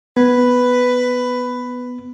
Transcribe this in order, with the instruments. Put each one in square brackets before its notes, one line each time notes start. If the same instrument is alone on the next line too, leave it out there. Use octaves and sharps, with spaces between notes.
[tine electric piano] B3 [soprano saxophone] B4